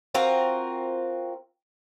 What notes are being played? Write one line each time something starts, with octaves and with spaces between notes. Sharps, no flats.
C4 F4 F#4 A#4